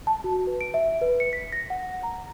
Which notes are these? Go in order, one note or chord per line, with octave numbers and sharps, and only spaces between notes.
A5
F#4
B4
D7
E5
B4
C#7
B6
A#6
F#5
A#5